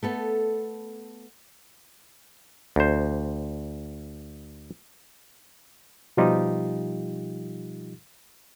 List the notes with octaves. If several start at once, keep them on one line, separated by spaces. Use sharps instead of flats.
A3 B3 A4
D2 C5
B2 F3 G3 D#4 F4 G4